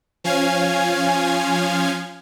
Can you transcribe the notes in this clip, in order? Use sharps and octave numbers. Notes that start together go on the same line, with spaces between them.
F3 C#4 F5 G#5 G#6